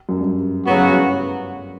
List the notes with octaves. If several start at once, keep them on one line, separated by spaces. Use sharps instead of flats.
F#2
G2
A2 C#3 F#3 B3 F#4
F#2
G2